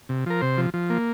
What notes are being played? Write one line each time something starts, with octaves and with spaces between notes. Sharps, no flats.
C3
F3 A#4
C3 C5
F3
F3
A#3